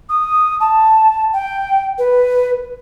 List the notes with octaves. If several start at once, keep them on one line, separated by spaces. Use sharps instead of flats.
D#6
A5
G5
B4